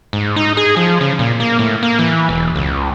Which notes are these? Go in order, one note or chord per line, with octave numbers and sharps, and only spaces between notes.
G#2
D#4
G#4
F3
C#3
A#2
A#3
A2
A#3
E3
E1
C#2